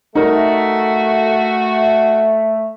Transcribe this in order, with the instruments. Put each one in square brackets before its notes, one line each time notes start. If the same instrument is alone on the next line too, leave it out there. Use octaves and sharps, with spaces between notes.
[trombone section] A3 [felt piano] D#4 A#4 [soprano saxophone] F#4